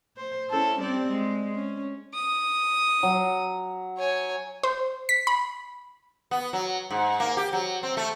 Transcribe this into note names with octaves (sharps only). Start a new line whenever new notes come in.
C5
C#4 E4 A4
G3 C4 D5
G#3
C#4
D#6
F#3
C#5 G#5
C5
B6
B5
B3
F#3
G#2
A#3
G4
F#3
C4
A3